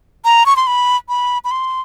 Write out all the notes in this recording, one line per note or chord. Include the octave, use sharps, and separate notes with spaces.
A#5
C#6
C6
B5
B5
B5
C6